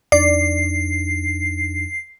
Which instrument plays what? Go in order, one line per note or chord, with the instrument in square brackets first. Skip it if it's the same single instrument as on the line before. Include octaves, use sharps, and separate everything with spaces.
[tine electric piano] F2 D4 D#4 [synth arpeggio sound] D5 [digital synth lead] C7